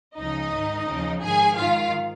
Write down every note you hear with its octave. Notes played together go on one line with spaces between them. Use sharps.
C#2 C#3 F3 D#4 D#5
G#2 D#3
D#2 C#3 F3
G#2 D#3 G#4 G#5
G#2 D#3 F4 F5